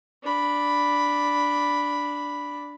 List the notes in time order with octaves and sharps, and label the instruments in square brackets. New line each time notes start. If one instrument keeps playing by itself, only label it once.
[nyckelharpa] D4 B5